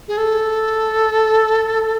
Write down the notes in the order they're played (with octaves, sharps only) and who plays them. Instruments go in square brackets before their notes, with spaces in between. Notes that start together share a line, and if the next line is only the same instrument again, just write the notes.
[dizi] G#4
A4